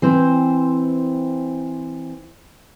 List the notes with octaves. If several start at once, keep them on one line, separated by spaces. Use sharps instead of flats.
E3 C4 C5